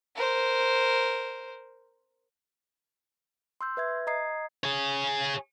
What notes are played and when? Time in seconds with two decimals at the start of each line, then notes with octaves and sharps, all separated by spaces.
0.16 A#4 C5
3.61 C6 E6 G6
3.77 B4 E5 G#6
4.07 D#5 A#5 D#6 G#6 C7
4.64 G#4 C#5